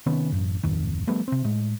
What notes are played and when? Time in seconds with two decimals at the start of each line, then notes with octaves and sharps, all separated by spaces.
0.06 C3 D#3 B3 C#4
0.32 A1 F#2
0.63 D1 G#1 F2 D#3
1.07 F3 G3 A3 B3
1.28 C3 C4
1.44 A2 G#3